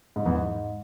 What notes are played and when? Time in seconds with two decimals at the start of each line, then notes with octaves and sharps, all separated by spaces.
0.16 G#2
0.26 E2
0.35 G#2